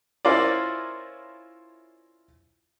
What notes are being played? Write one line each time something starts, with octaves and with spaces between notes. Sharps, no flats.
C#4 E4 F4 A#4 C5 D5